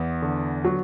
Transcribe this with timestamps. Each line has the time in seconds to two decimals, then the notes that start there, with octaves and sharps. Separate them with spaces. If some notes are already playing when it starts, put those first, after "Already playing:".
Already playing: E2 B3
0.22 D3
0.65 F#3